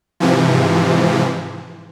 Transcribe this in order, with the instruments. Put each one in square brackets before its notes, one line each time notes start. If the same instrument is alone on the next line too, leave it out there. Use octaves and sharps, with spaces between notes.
[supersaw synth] G#2 C3 E3 F3